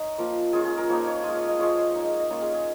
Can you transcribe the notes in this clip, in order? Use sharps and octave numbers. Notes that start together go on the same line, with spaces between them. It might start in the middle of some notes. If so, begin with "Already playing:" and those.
Already playing: D#4 C#5 A#5
F3 A#3 F4
G#3 C#4 F4 G#4
G#4
A#4
F3 A#3 D#4 C#5
C#5
G#3 F4 D#5
C#5
D#5
F3 G#3 F4 C#5
G#3 D#4
D#5
A#3 C#4 F4 C#5
G#4
G#4